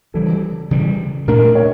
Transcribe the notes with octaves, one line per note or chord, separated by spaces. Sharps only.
C#3 E3 G3 A4
C#3 E3 G3
A#2 A3 D4 A#4
C#5